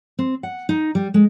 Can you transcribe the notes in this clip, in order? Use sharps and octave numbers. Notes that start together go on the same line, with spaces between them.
C4
F#5
D#4
G3
G#3